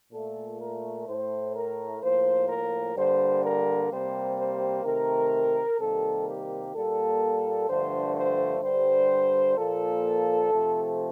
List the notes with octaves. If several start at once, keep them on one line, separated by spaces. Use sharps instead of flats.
A#2 A3 A4
A#4
A2 A3 C5
A#4
A2 F3 A#3 C5
A#4
G2 D3 G3 A#3 C5
A#4
C3 G3 A#3 C5
C5
C3 D#3 A3 A#4
C3 D#3 G3 A#3 A4
G4
A#2 G3 A#3 A4
G2 D3 F3 A3 C5
C5
G2 D3 G3 C5
A#2 F3 A#3 A4
C3 F3 A3